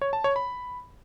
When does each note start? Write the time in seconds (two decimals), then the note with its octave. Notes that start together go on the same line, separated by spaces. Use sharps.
0.01 C#5
0.13 A5
0.24 C#5
0.36 B5